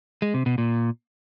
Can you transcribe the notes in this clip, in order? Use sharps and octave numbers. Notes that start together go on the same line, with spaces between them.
G#3
C3
B2
A#2